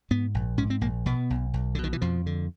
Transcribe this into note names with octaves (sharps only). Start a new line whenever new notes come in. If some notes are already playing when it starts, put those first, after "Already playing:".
G#2 B3
A#1
G#2 C#4
C4
A#1 A#3
B2 B3
B1
B1
D3
B2
D#3
E3
F2 F3
D3